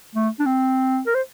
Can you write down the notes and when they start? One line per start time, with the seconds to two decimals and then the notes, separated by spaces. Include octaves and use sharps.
0.15 A3
0.39 D4
0.46 C4
1.06 A#4
1.14 C5